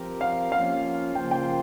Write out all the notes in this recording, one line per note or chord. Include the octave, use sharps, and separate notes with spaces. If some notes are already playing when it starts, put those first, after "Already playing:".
Already playing: F3 C4 G4 A#4
F5
F3 A#3 C#4 F4 F5
C#3 F3 A#3 F4 C5 G5
G5